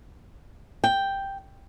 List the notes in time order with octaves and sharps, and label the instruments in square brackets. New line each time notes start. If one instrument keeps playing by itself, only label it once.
[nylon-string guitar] G5